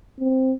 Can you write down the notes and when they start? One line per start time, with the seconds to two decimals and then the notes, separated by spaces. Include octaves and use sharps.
0.20 C4